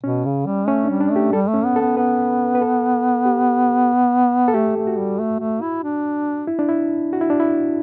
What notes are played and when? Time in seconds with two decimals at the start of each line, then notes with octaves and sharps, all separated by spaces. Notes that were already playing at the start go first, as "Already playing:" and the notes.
0.03 B2 C#4
0.25 C#3
0.46 G3
0.68 A3 C#4
0.84 D4
0.90 G3
1.00 D4
1.12 A3 G4
1.33 G3 A4
1.48 A3
1.54 C#4
1.65 B3
1.76 A4
1.81 B3
1.97 B3 B4
2.55 B4
2.61 A4
3.25 G4
4.48 A4
4.54 A3 G4
4.76 A3
4.87 F#4
4.98 G3
5.19 A3
5.40 A3
5.62 E4
5.83 D4
6.47 E4
6.59 D4
6.69 E4
7.13 F#4
7.21 E4
7.30 D4
7.40 E4